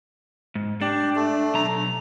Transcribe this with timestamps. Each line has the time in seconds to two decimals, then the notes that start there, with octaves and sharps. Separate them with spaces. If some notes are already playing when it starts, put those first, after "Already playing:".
0.55 G#2
0.81 D4 G4
1.16 A3
1.54 B1 A#5